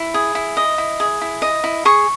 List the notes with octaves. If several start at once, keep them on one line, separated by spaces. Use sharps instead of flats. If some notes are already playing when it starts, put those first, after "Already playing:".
Already playing: E4
G#4
E4
D#5
E4
G#4
E4
D#5
E4
G#4 C#6